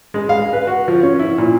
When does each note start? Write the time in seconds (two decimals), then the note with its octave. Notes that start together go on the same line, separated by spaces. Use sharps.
0.14 G#3
0.29 F5
0.53 B4
0.67 F#4
0.88 F3
1.03 C#4
1.19 E4
1.38 A#2